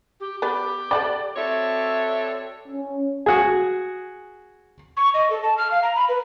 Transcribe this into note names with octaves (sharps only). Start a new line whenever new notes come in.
G4
B3 G4 B4 D5
A4 D5 F#5 G5
C4 F#4 A4 C#5 D5 E5
C#4
F#4 G#4
C#6
D#5
A4
A5
F6
F5
A#5
B5
B4